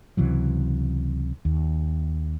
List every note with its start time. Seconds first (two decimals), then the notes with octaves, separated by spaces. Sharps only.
0.17 C#2 C3 E3 F#3
1.45 D#2